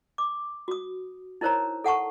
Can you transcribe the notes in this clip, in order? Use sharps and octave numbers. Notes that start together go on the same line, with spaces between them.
D6
F#4 D#6
D#4 E4 A#4 C5 C#5 A#5
A4 F#5 A5 C#6